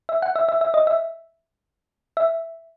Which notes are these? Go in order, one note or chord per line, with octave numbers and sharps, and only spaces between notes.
E5
F#5
E5
E5
E5
D#5
E5
E5